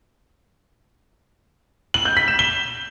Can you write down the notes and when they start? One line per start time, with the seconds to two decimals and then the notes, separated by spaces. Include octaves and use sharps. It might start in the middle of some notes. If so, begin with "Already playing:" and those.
1.94 F#7
2.05 G6
2.17 B6
2.28 E7
2.39 G7